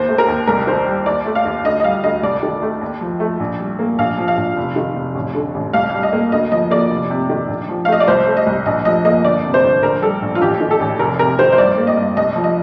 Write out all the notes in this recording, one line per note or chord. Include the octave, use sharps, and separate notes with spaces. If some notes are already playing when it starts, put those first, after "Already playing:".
Already playing: D#2 A#3 C5
A3
A#4
D#2
C2 A#4
D#3 C5
G3
D#2 D5
A3
F5
D#2
D2 D#5
D#5
G3 F5
D2 D#5
C2 D5
D#3
A3
D#2
F3
A3
A#1
G3
A#3
A#1 F5
F3
F5
A#1
F1
D#3
F1
A1
D3
A1
C2 F5
G3
D#5
A#3
D2 D#5
F3 D#5
A#3 D5
F1
C3
D#3
A#1
F3
F5
A3 D#5
D5
C2 C5
A3
D#5
C2
A#1 D#5
F3 D#5
A#3 D#5
G1 D5
C3
C5
G1
A#1 A#4
G3 A4
A#1
F4
A1 G4
D#3
A4
A1
F1 A#4
C3 A#4
D#3 C5
C5
G2 D5
A#3
D#5
G2
C2 D#5
F3
D#5